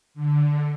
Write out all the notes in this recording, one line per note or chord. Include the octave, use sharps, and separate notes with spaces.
D3